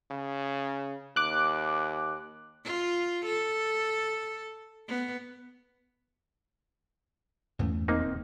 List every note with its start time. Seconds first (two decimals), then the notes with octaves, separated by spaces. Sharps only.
0.11 C#3
1.16 D#2 D6 F#6
2.65 F4
3.26 A4
4.89 B3
7.59 E2 G2 A3 C#4
7.88 D#1 A#3 C4 D#4